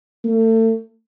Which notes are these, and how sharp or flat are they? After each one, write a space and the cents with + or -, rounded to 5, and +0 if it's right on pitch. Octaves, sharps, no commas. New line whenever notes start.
A3 +35